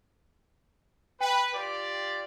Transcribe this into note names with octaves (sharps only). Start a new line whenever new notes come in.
B4 G5
F4 G4 D5